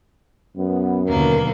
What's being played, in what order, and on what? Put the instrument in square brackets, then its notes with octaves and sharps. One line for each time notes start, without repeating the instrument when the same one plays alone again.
[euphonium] F#2 [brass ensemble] B3
[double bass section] D#2 B2 D3 [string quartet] F#3 A#3 B3 [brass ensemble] A#4